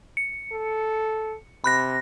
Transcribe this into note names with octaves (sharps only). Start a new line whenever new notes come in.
C#7
A4
C3 B5 F#6 A#6